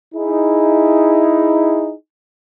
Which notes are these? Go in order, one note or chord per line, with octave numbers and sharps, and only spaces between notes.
D#4 E4 G#4